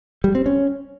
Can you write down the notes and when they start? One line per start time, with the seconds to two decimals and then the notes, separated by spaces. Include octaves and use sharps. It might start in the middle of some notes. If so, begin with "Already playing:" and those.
0.24 G3
0.35 C4
0.46 C#4